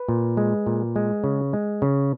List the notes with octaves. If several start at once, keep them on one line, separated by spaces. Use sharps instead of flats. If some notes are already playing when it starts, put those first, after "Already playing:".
Already playing: B4
A#2
G#3
A#2
G#3
C#3
G#3
C#3